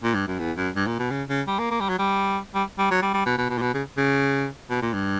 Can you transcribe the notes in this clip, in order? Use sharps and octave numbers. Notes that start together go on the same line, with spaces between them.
A#2
G2
F#2
E2
F#2
G2
A#2
B2
C#3
C#3
G3
A#3
A#3
G3
F#3
G3
G3
G3
F#3
G3
G3
B2
B2
B2
A#2
B2
C#3
C#3
B2
A#2
G2